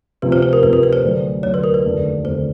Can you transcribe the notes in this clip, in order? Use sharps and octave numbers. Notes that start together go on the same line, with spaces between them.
D2 C3 F3 B4
C5
C5
A#4
D2 C3 F3 B4
A#4
B4
C5
D2 D3 F#3
D2 D3 F#3 C#5
B4
A#4
B4
F1 D#2 D3
F1 D#2 D3 C5